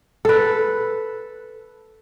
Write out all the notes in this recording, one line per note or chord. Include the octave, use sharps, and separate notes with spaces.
A4 B4